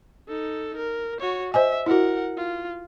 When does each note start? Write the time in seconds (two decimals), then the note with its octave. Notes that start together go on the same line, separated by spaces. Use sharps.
0.28 D#4 A4
0.77 A#4
1.21 F#4 C#5
1.54 C5 D#5 E5 G#5
1.86 E4 F#4 A#4 F#5
2.37 F4